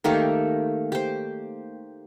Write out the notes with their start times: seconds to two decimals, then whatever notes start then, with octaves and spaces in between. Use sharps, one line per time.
0.04 D#3 A3 A#3 G4
0.92 G4 C5